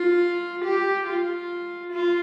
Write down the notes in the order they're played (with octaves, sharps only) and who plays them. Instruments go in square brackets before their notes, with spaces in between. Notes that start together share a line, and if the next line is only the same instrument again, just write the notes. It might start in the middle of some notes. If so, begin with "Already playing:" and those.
Already playing: [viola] F4
G4
F4
F4